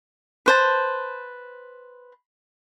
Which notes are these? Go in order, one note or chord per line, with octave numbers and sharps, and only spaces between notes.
B4 C5 A5